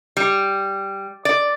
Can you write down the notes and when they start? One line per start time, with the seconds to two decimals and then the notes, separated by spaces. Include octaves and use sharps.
0.17 G3
1.25 D5